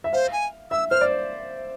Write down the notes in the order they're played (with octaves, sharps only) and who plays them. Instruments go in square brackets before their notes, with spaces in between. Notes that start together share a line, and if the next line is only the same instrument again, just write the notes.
[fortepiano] E5
[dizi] C5 [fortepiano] F5
[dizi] G#5
[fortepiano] E5 [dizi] E6
[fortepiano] C5 [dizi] F6
[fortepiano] D5